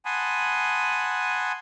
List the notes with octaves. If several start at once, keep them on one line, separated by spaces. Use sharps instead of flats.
F#5 G#5 A5 B5 C6 D#6